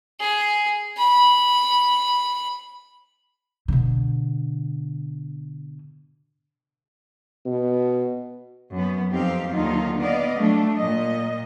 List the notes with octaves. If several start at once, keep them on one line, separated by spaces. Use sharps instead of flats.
G#4
B5
B2 D3
B2
F#2 B3
F2 C4 D#4 G4 F5
D#2 D3 D#3 F#3 D#4 F4
B3 D5 D#5 F5
F#3 G3 A3 D4
A#2 D#5